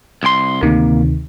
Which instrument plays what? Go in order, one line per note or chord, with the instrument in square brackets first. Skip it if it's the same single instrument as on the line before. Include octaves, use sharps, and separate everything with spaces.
[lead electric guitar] C2 C6
[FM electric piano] D2 C3 D#3 [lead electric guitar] A#3